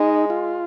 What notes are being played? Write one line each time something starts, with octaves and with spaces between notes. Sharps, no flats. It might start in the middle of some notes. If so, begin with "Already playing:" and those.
Already playing: G#3 D#4
F4